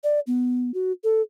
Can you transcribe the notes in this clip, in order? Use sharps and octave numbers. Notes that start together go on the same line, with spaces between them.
D5
B3
F#4
A4